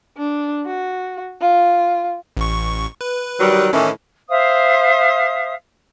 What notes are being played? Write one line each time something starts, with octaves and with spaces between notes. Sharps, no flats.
D4
F#4
F4
A1 C#6
B4
D#3 F#3 G3
A2 D#3 E3 C#4
C5 E5 F5 D#6